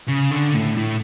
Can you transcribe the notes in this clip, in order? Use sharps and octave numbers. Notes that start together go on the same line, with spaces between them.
C#3
D3
A2
A2